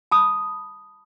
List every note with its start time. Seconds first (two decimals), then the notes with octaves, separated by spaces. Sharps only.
0.11 A5 B5 D#6